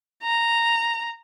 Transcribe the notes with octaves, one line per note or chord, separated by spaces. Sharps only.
A#5